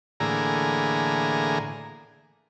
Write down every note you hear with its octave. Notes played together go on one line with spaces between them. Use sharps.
A2 D3 E3 A#3 G#4 A#5